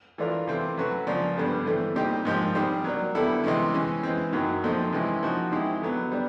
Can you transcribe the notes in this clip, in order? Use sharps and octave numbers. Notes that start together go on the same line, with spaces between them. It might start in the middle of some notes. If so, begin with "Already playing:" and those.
E3 A3 D4 F4 A#4
C3 E3 A3 C4
F#3 A3 C#4 F#4 B4
C#3 F3 A#3 D4
G2 D3 G3 B3
E3 A3 C4
A#2 G3 C4 D#4 G4
G#2 F3 A#3 D#4 G4
D#3 G3 C4
F#3 A#3 D4
D3 G3 B3 E4 A4
C3 E3 G#3 C#4
E3 G#3 C#4
E3 G#3 C4
F#2 D#3 F#3 A#3
A#2 F3 A3 C4 D#4
C3 E3 G#3 C#4 E4
F3 A#3 D#4 F#4
D#3 G#3 C4 E4 G4
D3 F#3 B3
G3 B3 D4